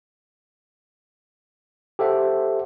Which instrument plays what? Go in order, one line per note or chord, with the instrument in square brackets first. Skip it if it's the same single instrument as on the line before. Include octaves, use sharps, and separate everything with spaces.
[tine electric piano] G4 A4 C5 E5 F#5